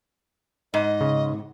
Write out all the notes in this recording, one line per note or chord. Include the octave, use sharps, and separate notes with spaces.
G#2 D#5
C#3